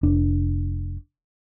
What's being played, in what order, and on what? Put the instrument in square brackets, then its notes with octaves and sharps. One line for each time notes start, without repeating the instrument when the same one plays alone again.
[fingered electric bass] F1 D4